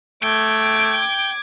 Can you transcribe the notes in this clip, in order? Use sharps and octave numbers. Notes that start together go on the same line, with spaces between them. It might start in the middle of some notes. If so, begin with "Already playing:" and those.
A3 G5 D6 G#6